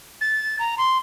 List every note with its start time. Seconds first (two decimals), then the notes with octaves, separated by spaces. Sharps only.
0.21 A6
0.59 A#5
0.78 C6